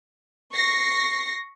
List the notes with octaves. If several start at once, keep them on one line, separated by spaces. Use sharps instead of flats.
C#6 A#6 C7